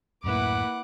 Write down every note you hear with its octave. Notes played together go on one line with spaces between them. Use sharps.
D1 F#2 A2 A#3 E4 B4 F#5 D6